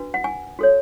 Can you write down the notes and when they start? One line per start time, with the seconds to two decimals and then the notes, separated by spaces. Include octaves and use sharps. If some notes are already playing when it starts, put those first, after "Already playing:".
Already playing: D4 F#4 B4
0.14 F#5
0.24 G#5
0.59 F#4 A4 C#5